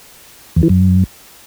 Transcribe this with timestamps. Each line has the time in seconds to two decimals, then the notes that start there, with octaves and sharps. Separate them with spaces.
0.56 E2
0.63 E3
0.69 F#2